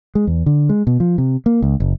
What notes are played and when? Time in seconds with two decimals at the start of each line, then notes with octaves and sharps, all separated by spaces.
0.15 G#3
0.27 E2
0.46 D3
0.69 G#3
0.87 B2
1.00 F3
1.18 C3
1.46 A#3
1.62 C#2
1.80 F#1